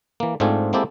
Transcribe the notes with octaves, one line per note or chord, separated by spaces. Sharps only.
E3 A#3
G#2 A3 C4 D4 F4 G#5
G#3 A#3 C4 E4 G4 A4